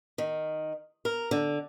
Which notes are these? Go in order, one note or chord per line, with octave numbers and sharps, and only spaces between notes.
D#3
A#4
D3